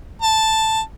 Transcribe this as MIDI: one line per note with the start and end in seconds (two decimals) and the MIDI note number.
0.22 0.81 81